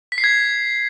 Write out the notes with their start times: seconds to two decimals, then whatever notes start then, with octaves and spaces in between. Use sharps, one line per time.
0.12 B6
0.18 C7
0.24 G#6